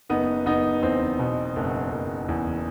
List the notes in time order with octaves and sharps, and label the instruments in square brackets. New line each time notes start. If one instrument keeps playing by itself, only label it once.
[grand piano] F#1 B3 D#4
F#1 B3 D#4
E2 C4
B2
F#1
F#1
E2